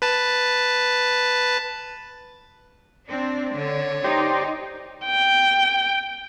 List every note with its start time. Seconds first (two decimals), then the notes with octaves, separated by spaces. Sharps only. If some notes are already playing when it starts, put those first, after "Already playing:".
0.02 B4 A5
3.08 C4 D4
3.57 D3 C#5
4.04 D#4 G4 C5 D5
5.06 G5